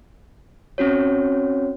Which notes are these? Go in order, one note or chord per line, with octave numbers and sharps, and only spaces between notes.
C4 C#4 F#4 C#5